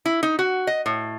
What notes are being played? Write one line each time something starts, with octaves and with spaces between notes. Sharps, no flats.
E4
D#4
F#4
D#5
A2